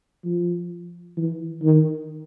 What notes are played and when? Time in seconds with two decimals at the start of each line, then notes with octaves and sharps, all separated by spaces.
0.25 F3
1.17 E3
1.63 D#3